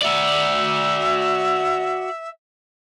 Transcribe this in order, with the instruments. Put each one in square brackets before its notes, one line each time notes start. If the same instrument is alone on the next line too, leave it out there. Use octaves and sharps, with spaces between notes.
[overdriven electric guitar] F#4 D5 [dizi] E5